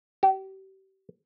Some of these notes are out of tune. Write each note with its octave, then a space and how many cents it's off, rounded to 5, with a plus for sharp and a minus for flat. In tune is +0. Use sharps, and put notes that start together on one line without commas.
G4 -35